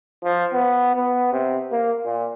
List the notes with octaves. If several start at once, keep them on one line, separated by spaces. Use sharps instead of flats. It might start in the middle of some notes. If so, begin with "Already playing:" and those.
F3
B3
B3
C3
A#3
A#2